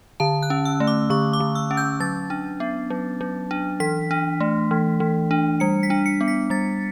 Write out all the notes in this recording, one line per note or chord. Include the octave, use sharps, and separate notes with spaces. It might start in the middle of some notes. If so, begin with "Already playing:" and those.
D3 A5
F#6
C#4
E6
A3
D6
D3 C#6
D6
D3
E6
C#4
G6
F#3 A6
D4
B3
F#3
F#3
D4
E3 B6
D4
A3
E3
E3
D4
G3 C#7
B6
D4
C#7
B3
B6
G3 A6